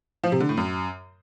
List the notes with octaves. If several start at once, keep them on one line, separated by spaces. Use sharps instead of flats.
F3
C3
D3
A2
F#2